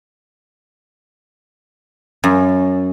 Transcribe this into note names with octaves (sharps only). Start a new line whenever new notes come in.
F#2